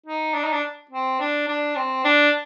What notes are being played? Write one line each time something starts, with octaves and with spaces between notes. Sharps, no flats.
D#4
D4
D#4
D4
C4
D4
D4
C4
D4